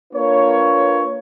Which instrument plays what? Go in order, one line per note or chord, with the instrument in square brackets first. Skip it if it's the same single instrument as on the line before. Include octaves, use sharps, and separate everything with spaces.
[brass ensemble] A#3 D4 F4 B4 C#5